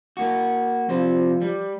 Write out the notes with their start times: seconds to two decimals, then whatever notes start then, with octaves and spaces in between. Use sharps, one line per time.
0.17 A#3 F#4
0.89 C3 F3 G3 C5
1.42 G3